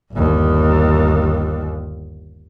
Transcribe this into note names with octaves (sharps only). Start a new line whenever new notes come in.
G1 D#2